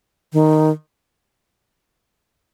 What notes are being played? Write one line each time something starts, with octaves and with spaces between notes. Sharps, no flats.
D#3